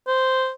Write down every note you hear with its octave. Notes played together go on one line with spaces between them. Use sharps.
C5